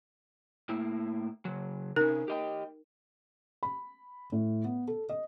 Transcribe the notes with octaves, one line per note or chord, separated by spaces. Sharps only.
A2 A#3 E4
C#3 F#3
C3 C#4 D#4 A#4
G4 D#5 G5
B5
A2
B3
A4
D#5